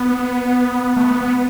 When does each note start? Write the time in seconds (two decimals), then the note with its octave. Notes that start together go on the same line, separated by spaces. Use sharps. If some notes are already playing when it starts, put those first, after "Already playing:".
Already playing: B3
0.97 A3
1.02 B3
1.21 B3